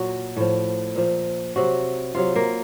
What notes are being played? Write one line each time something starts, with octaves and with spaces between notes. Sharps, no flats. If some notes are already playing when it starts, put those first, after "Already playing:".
Already playing: A#2 F#3 F#4
A2 F3
A#2 F3
C3 F#3 F#4
C3 F#3 F4
A#3